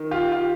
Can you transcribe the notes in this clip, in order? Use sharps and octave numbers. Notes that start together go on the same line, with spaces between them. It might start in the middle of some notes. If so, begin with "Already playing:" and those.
Already playing: D#3
F4 G4
F4 G4